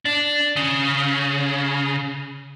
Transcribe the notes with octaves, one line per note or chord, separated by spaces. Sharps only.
D4
C#3